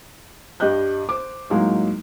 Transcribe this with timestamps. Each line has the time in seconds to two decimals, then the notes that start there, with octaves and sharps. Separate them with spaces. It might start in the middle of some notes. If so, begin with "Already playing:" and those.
0.60 G2 G3 G4 D#5 F#6 G6
1.09 C5 D6
1.50 A2 F#3 G#3 A#3 D#4